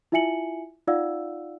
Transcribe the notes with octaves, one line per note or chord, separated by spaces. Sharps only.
E4 F4 E5 G#5 C#7 F#7
D#4 F4 D5 F5 F#5 E6